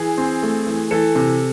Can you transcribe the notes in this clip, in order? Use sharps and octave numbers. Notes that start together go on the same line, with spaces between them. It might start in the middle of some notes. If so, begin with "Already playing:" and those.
Already playing: E3 G#4
C4
A3
E3
E3 A4
C3